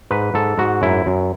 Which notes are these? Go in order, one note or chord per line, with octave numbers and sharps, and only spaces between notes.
G#2 B4
G#2 A4
G#2 F#4
F#2 E4
F#2